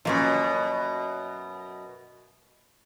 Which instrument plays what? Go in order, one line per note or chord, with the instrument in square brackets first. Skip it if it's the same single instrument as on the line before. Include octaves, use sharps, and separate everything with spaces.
[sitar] F#2 B2 [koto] F3 A#3 C#4